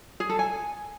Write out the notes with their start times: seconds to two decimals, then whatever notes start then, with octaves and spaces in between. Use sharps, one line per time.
0.20 G#4
0.29 A4
0.39 G#5